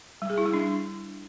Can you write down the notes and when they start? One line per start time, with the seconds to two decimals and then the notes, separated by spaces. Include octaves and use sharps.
0.22 G3
0.30 G#4
0.38 E4
0.46 G3
0.54 D4